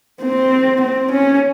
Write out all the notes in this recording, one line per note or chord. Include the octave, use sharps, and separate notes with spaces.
C4
C4
C#4